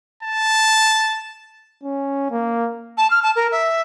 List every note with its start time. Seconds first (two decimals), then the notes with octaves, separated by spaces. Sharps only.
0.23 A5
1.83 C#4
2.30 A#3
2.97 A5
3.11 F6
3.23 A5
3.36 A#4
3.52 E5